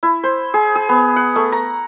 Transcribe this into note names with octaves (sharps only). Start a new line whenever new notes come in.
E4
C5
G#4
G#4
B3
F#5
A3
A#5